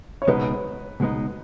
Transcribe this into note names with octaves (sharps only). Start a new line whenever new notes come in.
C#5
C#2 B2 G#3 B3 D#4 B4
C#2 B2 G#3 B3 D#4